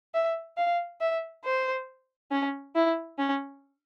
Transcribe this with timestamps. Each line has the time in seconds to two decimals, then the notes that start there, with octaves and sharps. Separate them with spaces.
0.14 E5
0.57 F5
1.01 E5
1.44 C5
2.31 C#4
2.75 E4
3.18 C#4